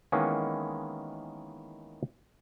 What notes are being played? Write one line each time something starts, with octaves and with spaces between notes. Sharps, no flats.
D#3 E3 G#3 A#3 B3 C#4